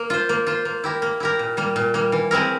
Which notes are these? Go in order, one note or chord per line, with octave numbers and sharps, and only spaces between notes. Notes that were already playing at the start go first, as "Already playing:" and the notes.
Already playing: A#3
F4 C5
A#3
F4 C5
A#3
E4 G4 A#4
A#3
E4 G4 A#4
A#2
G3 A#3
A#2
G3 A#3
E3
G#3 C4 E4 A#4